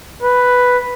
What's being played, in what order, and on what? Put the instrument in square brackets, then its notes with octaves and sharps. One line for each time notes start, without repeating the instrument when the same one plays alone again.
[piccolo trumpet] B4